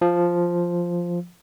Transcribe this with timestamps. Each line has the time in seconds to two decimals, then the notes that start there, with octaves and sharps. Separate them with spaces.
0.02 F3